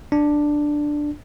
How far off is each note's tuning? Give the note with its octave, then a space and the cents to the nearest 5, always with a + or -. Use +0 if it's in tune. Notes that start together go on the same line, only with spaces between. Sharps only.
D4 +5